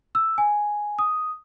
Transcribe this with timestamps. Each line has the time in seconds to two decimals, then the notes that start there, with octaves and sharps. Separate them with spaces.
0.15 E6
0.38 G#5
0.99 D#6